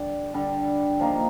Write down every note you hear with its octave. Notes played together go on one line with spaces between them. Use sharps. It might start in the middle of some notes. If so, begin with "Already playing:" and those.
Already playing: D3 G3 D4
D3 G3 D4
F3 A#3 D#4